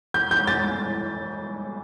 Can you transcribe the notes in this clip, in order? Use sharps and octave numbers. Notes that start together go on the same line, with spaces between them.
G6
G6
A6